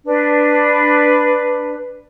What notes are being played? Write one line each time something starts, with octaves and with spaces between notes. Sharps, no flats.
D4 B4